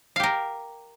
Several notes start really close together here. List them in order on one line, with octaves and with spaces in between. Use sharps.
F5 G4 A#4